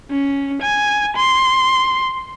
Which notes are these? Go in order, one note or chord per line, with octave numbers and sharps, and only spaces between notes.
C#4
G#5
C6